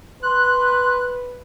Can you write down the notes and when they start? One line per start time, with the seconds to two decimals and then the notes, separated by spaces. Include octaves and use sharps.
0.23 B4 C6 F#6